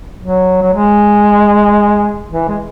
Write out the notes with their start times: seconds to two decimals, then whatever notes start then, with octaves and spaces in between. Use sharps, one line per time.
0.21 F#3
0.62 F#3
0.74 G#3
2.31 E3
2.48 G#3